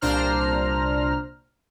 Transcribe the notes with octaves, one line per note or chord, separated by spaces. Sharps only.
C2 A#2 D4 C5 A#5 F6